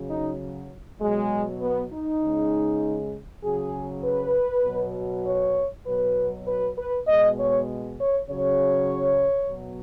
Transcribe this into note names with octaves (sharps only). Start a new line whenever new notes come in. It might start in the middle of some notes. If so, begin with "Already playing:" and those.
Already playing: C#3 F#3
D#4
B2 F#3 G#3
B3
D#4
C#3 G#3
C#3 F#3 G#4
B4
B2 F#3
C#5
B2 F#3 B4
B4
B4
B2 G#3 D#5
C#5
C#5
C#3 F#3 C#5
B2 F#3